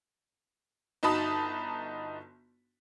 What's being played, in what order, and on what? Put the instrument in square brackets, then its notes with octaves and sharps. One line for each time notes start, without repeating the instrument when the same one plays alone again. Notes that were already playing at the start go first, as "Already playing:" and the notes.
[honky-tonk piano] G1 D#4 F#4 A5 B5 D#6